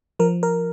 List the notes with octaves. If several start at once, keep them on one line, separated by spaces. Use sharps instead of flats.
F3 A#4
A#4